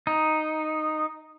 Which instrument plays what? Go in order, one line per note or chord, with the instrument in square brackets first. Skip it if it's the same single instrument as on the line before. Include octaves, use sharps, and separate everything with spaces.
[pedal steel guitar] D#4